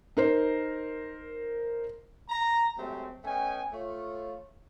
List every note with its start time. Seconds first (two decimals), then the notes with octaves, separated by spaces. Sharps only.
0.17 D#4 A#4 C5
2.29 A#5
2.78 C3 F#3 G#3 A3 C4
3.24 A3 B3 C#4 D#5 G5 G#5
3.72 A3 F4 C#5